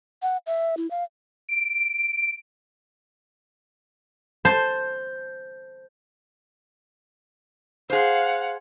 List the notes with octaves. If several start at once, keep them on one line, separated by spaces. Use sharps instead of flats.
F#5
E5
E4
F5
D7
C5 A5
G#4 C5 F5 F#5